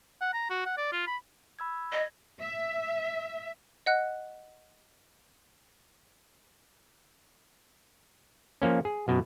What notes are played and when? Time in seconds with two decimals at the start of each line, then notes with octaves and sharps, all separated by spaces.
0.21 F#5
0.34 A#5
0.50 F#4
0.66 F#5
0.77 D5
0.92 F4
1.07 B5
1.59 B5 E6 G#6
1.93 D#5 G#6 A#6
2.41 E5
3.86 D#5 F#5 F#6
8.62 F3 A#3 C#4
8.85 G#4
9.08 F#2 B2